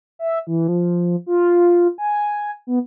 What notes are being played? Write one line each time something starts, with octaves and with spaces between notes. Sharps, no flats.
E5
E3
F3
F4
G#5
B3